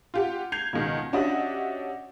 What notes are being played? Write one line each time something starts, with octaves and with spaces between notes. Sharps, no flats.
F4 G4 F#5
G6 G#6 C7 F7
C#2 B2 D#3
C#4 D4 F#4 G4 D#5 E5